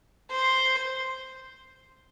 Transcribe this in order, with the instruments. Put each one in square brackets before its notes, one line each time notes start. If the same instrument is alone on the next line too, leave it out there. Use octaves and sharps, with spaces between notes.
[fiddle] C5